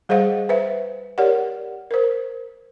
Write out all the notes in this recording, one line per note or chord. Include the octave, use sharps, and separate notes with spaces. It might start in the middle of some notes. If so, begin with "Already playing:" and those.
G3 G#4 C5 D#5 F5 F#5
B4 C5 E5
G4 A#4 C#5 D5 F#5
A#4 C5